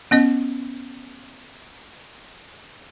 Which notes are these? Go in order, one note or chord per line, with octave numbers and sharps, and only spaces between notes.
B3 C#4 D#5